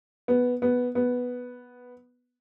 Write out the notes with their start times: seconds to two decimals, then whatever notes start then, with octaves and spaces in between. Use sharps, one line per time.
0.28 B3
0.62 B3
0.95 B3